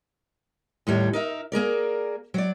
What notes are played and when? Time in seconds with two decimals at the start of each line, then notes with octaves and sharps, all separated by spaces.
0.87 D#2 A2 G3 C#5
1.13 D#4 A#4 E5
1.52 A#3 G#4 A#4 D5
2.34 F#3 D5